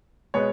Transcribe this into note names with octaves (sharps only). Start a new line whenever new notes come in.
B2 G#3 B3 C#5